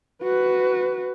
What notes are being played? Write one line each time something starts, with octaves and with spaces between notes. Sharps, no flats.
F#4 B4